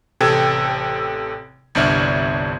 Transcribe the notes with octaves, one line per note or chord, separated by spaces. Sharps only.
A1 C3 A4 G5 G#6
G1 C2 D4 D5 E5 F6